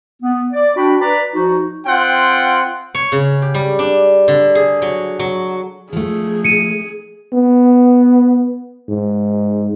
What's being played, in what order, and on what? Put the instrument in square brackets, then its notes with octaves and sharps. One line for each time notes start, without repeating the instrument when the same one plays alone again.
[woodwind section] B3
D5
D4 F#4 G5 B5
B4 D5 A#5 B5
F3 D#4 F#4
[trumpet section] C4 F4 F#5 G5
[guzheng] C#5
C#3
G4
G3
D4
D3
G#4
F#3
F#3
[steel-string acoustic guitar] F3 A3 [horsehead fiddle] G#4
[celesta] C#7 D#7
[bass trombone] B3
G#2